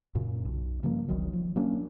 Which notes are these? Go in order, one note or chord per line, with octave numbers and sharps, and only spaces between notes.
F#2 A#2 C#3
B1
G2 C#3 F3 A#3
E1 B1 D#3 F#3
F3
F#3 A#3 C#4 D4